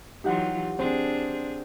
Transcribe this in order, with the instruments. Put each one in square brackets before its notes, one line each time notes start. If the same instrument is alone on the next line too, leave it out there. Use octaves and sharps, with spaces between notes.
[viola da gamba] E3 F#3 F4 [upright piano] D#4 [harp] G4 F#5 C6
[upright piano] C4 [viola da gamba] D4 G#4 [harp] C6